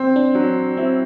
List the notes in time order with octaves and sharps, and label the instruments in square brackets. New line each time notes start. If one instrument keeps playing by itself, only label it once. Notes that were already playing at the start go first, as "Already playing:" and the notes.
Already playing: [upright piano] C4
[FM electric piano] D4
[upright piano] F#3
[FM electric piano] C4 [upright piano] E4